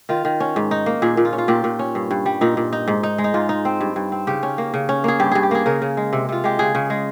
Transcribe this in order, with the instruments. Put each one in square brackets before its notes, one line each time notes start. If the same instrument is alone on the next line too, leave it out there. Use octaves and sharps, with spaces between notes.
[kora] D#3 F4
D#3
C#4
G#2
D#4
A#3
A#2 G#4
A#2
F4
C#4
F4
A#2 G4
A#2
C#4
G2
G2
G3
A#2 D#4
A#2
D#4
G#2
D#4
G#3
D#4
G#2 F4
D#4
C4
G2
G2
C4
C#3 G4
C#4
A#3
C#3
C#4
A#3 G#4
G2 G4
G2 G#4
G4
A#3 G#4
C#3 A#4
C#3
G#3
C3
C3 F4
G#3 G4
C#3 G#4
C#3
G#3